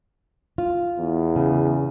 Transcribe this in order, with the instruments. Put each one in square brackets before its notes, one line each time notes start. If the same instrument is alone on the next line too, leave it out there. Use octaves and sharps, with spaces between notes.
[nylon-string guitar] F4
[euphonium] E2
[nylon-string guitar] C#3